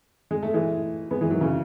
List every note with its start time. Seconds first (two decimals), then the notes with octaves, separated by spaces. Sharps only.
0.31 G#3
0.43 A3
0.54 E3 G#3
1.11 G#3 B3
1.21 E3 G#3
1.30 D#3 F#3
1.41 C#3 E3